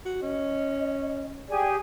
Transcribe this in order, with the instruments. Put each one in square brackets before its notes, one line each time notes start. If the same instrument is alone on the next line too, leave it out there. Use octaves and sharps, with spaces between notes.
[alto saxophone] F#4
[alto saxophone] C#4 [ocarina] D#5
[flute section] G4 G#4 G#5 [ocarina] D5